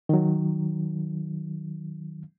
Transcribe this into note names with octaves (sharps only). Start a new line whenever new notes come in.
D#3 F#3